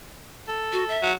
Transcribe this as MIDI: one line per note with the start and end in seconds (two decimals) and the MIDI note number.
0.48 0.97 69
0.73 0.84 66
0.89 1.09 76
1.03 1.13 54